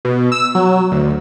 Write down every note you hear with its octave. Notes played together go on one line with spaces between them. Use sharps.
B2
E6
F#3
D2